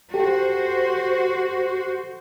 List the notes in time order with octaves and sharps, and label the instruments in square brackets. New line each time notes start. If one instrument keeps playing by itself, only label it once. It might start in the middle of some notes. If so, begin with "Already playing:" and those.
[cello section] F#4 C5 [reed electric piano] G4 A4